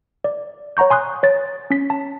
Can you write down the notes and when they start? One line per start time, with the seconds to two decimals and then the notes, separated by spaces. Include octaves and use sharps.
0.24 D5
0.77 C#5 F#5 A#5 C#6 G6
0.90 G#5 C6 D#6 F#6
1.23 C#5 A6
1.70 C#4 B6
1.90 A5